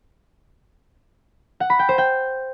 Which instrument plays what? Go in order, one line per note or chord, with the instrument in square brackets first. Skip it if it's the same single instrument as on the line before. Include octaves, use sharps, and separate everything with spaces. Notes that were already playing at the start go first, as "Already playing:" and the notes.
[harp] F#5
B5
G5
C5
G5